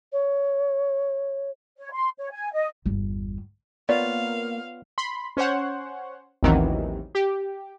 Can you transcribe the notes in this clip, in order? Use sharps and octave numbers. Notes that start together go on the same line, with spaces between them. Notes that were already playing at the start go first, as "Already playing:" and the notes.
C#5
C#5
C6
C#5
G#5
D#5
G1 E2
A#3 B3 F4 C#5 D5 F5
B5 C6
C#4 C5 C#5 F#5
A1 D#2 C3 D#3 E3 F#3
G4